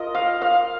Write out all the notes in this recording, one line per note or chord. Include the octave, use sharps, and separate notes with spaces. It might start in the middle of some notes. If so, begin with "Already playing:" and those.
Already playing: F4 A#4 D#5
F5
F5